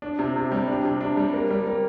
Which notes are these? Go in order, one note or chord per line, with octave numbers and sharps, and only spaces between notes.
D4
C3
C3
G3
D4
C3
D4
G3
A#3
G3
A#3